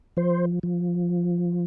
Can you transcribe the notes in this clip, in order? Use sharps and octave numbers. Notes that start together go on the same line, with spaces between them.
F3 C5
F3